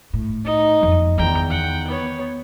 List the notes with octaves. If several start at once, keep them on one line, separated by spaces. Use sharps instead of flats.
A2
D#4 D#5
F#1 F2
E2 D#3 G5 A#5
F#5 G5
B3 C#5